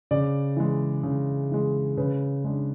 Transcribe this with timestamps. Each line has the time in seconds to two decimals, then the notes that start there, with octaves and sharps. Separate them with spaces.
0.11 C#3 D5
0.57 E3 G#3
1.03 C#3
1.51 E3 G#3
1.97 C#3 B4
2.44 G#3 D4